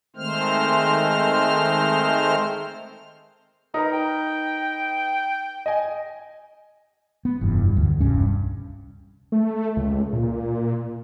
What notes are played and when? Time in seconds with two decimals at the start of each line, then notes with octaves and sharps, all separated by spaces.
0.16 D#3 G#3 A3 C4 C5 F6
3.74 D#4 A#4 B4 A#5
3.93 G5
5.66 D#5 G#5
7.25 B3
7.41 F1 G2 E3
7.77 D2
8.00 E1 C2 G2 C#4
9.32 A3
9.77 C#2
10.13 A#2